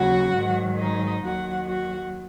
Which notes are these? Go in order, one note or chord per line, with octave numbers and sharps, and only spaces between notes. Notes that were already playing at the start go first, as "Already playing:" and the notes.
Already playing: D#2 C#3 F#3 F#4 F#5
G#2 D#3 F#3
D#4 D#5
D#2 D#3 F#3 F#4 F#5
F#4 F#5